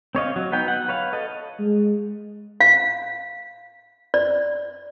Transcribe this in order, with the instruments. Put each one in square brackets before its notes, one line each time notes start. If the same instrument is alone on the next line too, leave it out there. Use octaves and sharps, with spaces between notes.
[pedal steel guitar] C4 C#5 D#5 F5
F#3
B3 D#4 G5
F#5
B4 C#5 F5
A4 D#5
[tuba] G#3
[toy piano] F5
D5